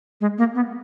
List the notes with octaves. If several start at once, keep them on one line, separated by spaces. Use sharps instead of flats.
G#3
A#3
B3